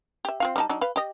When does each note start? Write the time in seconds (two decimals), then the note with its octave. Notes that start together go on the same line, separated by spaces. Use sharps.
0.25 G4 E5
0.40 C4 F4 F5
0.56 G3 D#4 A5
0.69 F#3 D4 D#4
0.81 B4 F5
0.96 G4 D#5